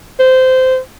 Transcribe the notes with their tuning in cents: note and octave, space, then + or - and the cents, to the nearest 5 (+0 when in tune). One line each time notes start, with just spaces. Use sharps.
C5 -15